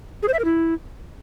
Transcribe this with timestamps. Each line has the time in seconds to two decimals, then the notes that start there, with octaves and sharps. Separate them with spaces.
0.22 G#4
0.28 C5
0.33 E5
0.39 A#4
0.45 E4